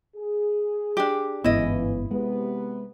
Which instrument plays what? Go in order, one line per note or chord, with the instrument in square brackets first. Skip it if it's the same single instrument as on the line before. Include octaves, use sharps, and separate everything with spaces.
[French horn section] G#4
[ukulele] D4 G4
[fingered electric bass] G1 G#2 B3 [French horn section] C#3 E3 [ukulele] E4 D#5
[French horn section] C3 B3 [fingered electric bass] G#3